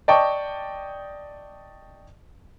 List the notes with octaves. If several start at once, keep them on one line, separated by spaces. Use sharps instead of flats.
D5 D#5 G5 A5 C#6